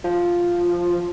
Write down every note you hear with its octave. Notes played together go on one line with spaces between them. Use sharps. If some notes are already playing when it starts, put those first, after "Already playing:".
F3